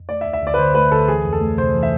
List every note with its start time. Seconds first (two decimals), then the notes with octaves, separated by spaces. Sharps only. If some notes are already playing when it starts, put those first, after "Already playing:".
Already playing: F2
0.09 A3 D5
0.21 E5
0.25 D2
0.33 E5
0.42 D2 D5
0.54 B4
0.59 D3 C5
0.75 A3 B4
0.92 D2 A4
1.08 E3 G#4
1.25 F2
1.33 A4
1.41 A3
1.58 C3 C5
1.74 E3
1.83 E5